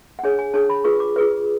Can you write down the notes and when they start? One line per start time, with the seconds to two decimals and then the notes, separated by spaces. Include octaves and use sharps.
0.19 F#5
0.23 D4 G#4 C#5 G#5
0.39 G#5
0.54 D4 G#4 C#5 A5
0.70 B5
0.84 F4 G#4 B4 C#6
1.00 D6
1.16 F4 G#4 B4